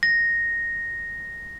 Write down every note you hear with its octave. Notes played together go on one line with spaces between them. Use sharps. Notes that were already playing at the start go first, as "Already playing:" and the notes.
A#6